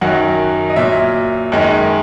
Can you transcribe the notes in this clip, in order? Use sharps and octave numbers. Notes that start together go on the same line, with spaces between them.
F#2 D#3 F#3 F#5
D#5
A#2 F#3 E5
F#2 D#3 G#3